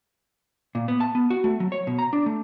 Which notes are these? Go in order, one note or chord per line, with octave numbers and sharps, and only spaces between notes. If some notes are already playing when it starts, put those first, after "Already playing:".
A#2
B3
A5
B3
F#4
A3
F#3
C#5
B2
A#5
D4
A3